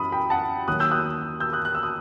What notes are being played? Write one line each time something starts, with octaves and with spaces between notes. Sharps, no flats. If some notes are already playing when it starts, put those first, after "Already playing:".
Already playing: F#2 E3 B5 D#6
G5 B5
F#5 A5
D#2 D#3 F#3 D#6 F#6
E6 G6
D#6 F#6
E6 G6
D#6 F#6
F#6
E6
D#6